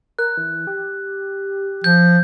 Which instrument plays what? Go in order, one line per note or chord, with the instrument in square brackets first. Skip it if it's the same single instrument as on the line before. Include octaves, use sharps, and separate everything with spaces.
[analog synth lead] A#4 [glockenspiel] F#6
[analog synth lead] E3
G4
[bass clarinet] F3 [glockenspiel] G6